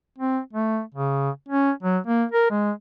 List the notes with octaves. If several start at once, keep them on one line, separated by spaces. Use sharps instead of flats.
C4
A3
C#3
C#4
F#3
A#3
A#4
G#3